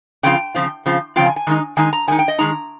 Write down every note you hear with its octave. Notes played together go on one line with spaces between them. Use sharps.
C#3 F3 C4 F4 G5
C#3 F3 C4 F4
C#3 F3 C4 F4
C#3 F3 C4 F4 G5
G#5
G#5
D#3 G#3 D#4
D#3 G#3 D#4 G#5
A#5
D#3 G#3 D#4 G#5
G5
D#5
D#3 G#3 D#4 A#5